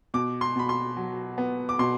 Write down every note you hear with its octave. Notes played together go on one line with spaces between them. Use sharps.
B2 D6
C6
B2 B5
C6
F#3
B3
D6
B2 C6